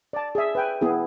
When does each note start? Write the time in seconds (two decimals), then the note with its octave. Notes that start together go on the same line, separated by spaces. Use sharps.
0.13 D5 A5
0.35 G#4 E5
0.55 B4 G5 G#5
0.81 B3 E4 G#4